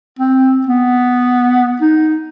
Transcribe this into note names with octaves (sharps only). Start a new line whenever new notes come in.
C4
B3
D#4